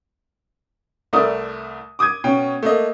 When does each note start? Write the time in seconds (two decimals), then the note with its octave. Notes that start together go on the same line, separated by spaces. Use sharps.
1.13 C2 A3 E4 A#4 D5 D#6
1.99 D6 D#6 G6 G#6 D#7
2.24 B2 C#4 G5
2.63 A3 A#3 D#5